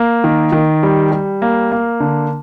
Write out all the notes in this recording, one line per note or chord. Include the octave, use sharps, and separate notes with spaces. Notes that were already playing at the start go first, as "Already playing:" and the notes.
Already playing: A#3
D#3
D#3
G3
G3
A#3
A#3
D3